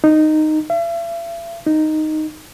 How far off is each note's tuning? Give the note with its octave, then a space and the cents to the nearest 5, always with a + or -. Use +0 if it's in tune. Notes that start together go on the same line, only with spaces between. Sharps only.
D#4 -10
E5 +45
D#4 -5